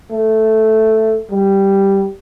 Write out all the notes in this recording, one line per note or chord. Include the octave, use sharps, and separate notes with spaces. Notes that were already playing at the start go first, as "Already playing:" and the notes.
A3
G3